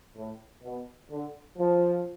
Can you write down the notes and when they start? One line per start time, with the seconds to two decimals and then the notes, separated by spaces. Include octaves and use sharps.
0.16 A2
0.63 B2
1.10 D3
1.58 F3